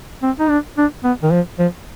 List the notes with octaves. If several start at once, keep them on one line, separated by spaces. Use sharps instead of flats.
C4
D#4
D4
D4
B3
D#3
F3
F3